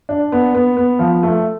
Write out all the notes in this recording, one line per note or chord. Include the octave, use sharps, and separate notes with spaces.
D4
B3
B3
B3
F3
A3